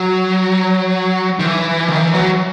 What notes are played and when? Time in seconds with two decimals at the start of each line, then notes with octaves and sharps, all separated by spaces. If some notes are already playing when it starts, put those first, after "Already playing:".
Already playing: F#3
1.40 D#3
1.44 E3
1.89 D#3
2.01 E3
2.14 F#3